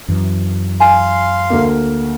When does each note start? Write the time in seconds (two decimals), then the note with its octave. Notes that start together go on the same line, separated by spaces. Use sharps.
0.08 F#2 E3
0.80 F5 G#5 C6
1.50 D2 A#3